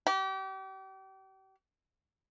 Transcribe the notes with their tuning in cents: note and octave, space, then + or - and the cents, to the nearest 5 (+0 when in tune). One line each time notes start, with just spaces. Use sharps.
G4 -35